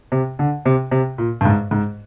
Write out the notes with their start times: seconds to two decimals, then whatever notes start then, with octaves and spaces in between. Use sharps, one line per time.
0.12 C3
0.39 D3
0.65 C3
0.91 C3
1.18 A#2
1.41 G2
1.45 G#2
1.71 G#2